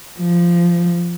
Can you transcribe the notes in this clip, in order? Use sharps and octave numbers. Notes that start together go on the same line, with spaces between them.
F3